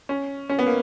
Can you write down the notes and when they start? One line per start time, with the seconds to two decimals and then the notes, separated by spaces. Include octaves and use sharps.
0.09 C#4
0.49 C#4
0.59 B3
0.66 A#3